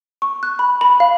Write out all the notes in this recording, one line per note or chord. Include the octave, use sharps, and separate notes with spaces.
C#6
F#6
B5
B5
F5